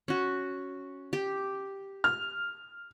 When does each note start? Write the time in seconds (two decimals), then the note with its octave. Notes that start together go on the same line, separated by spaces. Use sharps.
0.08 C#4 F#4
1.13 G4
2.04 F6